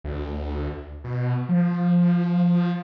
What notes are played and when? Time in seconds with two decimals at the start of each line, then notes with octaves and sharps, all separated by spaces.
0.04 D2
1.04 B2
1.49 F3